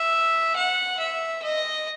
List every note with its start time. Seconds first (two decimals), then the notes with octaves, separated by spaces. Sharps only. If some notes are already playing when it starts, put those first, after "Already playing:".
Already playing: E5
0.56 F#5
0.99 E5
1.43 D#5